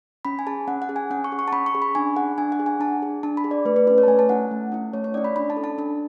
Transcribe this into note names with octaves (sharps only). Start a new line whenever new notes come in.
C#4 B5
G#5
G#4 A5
C#4 F#5
F#5
G#4
G#5
C#4 F#5
C#6
G#4
C#6
A5
C#4 B5
C#6
G#4
B5
D4 G#5
G#4 F#5
D4 G#5
F#5
G#4
G#5
D4 A5
G#4
D4 A5
B5
G#4
D5
A3 B4
B4
C#4 E4 B4
C#5
A5
A3 G#5
A5
C#4 E4 F#5
A3
C#4 E4
A3 C#5
C#5
C#4 E4 D5
B5
D4 B5
A5
A4
A5
D4 A5